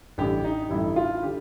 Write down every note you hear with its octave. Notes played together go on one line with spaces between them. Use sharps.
A1 G2 D3 G4
D#4
A1 G2 D3 E4
F4
D3 G4